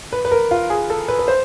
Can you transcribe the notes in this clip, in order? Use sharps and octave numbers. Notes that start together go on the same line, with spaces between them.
B4
B4
A#4
F4
G#4
A4
B4
B4
C5